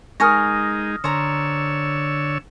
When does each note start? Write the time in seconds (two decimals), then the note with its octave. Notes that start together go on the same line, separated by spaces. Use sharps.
0.20 G#3 D#4 A#4 G#5 C#6 D#6 F6 A#6
1.04 D3 C5 C#5 A#5 E6